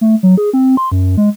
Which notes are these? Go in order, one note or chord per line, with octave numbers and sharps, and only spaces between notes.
A3
F#3
G#4
C4
C6
F#2
G#3